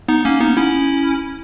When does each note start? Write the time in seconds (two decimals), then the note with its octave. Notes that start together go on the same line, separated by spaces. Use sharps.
0.08 B3 D#4
0.25 A#3 C#4
0.40 B3 D#4
0.57 C#4 E4